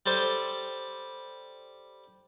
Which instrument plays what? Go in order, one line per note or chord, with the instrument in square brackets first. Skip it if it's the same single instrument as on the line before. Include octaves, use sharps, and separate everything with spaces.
[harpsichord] G3 A4 C5